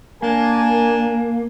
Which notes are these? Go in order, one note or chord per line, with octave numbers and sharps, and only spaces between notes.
A#3 D4 A#4 G#5